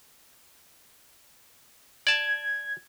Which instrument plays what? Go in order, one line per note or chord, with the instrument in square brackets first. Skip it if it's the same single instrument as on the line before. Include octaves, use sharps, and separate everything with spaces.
[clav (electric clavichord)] D5 A5 [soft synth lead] G#6